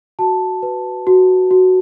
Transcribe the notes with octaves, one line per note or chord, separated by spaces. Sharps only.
F#4 A5
B4
F#4
F#4